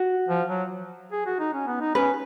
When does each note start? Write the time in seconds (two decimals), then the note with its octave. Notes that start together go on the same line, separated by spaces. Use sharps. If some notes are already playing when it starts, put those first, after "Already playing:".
Already playing: F#4
0.28 F3
0.49 F#3
1.12 G#4
1.26 F#4
1.39 D#4
1.53 C#4
1.67 B3
1.81 D#4
1.95 C#4 B4